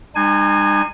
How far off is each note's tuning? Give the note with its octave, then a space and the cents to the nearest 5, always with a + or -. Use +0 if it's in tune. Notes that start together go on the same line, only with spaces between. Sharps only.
G3 +40 D#4 -45 G#5 +0